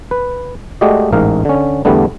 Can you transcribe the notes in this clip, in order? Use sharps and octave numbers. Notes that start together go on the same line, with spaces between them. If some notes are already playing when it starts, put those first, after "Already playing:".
B4
G#3 A3 F#4 G4 D5 D#5
A1 G#2 A#4 F5
D3 C#4
E2 D3 G3 A3 B3 D4